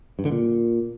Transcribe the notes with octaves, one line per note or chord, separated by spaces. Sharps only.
G2
D3
A#2